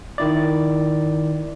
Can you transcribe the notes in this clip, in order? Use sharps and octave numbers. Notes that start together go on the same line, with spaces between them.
D#3 E4 D5